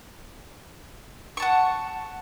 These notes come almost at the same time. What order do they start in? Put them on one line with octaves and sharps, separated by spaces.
C#6 A5 F#5